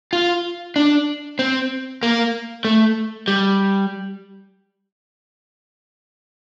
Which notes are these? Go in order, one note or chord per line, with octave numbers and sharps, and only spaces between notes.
F4
D4
C4
A#3
A3
G3